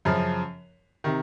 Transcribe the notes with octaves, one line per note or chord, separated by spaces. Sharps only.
F#2 C#3 F3
C3 D#3